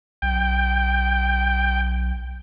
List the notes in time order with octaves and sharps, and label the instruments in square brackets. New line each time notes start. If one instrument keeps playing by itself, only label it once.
[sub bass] B1 [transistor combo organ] G5